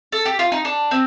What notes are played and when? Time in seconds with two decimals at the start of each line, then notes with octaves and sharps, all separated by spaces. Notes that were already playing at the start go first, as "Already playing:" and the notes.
0.12 A4
0.25 G4
0.39 F4
0.52 D#4
0.65 D4
0.91 C4